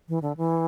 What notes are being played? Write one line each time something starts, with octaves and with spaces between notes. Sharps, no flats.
E3
D3
E3